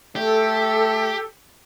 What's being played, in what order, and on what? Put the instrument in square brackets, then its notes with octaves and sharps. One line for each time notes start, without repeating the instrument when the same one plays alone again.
[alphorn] A3 [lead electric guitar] G4 [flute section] A4